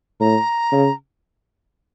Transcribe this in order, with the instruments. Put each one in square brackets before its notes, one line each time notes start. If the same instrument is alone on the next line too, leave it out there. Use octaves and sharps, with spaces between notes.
[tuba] A2 [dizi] A#5
[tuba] C#3